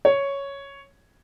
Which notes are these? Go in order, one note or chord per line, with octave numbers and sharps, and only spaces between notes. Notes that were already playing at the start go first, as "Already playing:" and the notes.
C#5